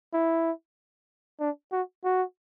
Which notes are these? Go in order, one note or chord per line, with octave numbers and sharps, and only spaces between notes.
E4
D4
F#4
F#4